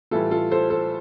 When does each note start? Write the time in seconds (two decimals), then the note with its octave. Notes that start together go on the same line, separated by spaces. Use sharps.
0.11 A2 E3 G3 F4 A4
0.31 F4 A4
0.51 A4 C5
0.70 A4 C5